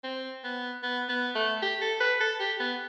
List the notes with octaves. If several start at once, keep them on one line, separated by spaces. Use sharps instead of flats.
C4
B3
B3
B3
A3
G4
A4
B4
A4
G4
B3